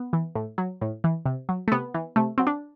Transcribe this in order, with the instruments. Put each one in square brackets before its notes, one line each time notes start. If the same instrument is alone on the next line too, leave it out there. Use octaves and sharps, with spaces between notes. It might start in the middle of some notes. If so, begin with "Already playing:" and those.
Already playing: [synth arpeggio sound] B3
E3
A2
F#3
A2
E3
C3
F#3
A3
C3 B3
E3
C3 A3
F#3 C4
D4